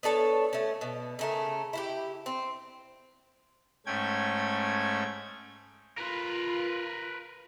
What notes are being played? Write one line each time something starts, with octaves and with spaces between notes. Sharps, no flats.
B3 D4 A4 C#5
A3 C#4
B2
C#3 A3 A#4
E4 F4 G4
C4
G#2 A3 C#4 G5 G#6
F4 A#4 B4